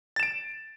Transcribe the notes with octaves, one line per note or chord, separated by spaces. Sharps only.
A6 D7 E7